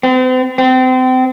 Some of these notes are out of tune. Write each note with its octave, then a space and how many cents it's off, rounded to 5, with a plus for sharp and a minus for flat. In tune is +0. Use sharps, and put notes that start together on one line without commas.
C4 -40
C4 -30